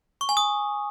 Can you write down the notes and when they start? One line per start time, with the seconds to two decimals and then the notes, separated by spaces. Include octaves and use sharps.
0.21 C#6
0.29 G#5
0.37 D#6